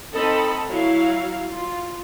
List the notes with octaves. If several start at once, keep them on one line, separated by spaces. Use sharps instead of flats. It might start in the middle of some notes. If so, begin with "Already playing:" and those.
C4 D#4 A4 D#5 A5 B5
F#3 E4 F5
F4